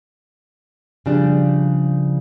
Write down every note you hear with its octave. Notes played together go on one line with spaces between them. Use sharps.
C#3 F3 G3 D4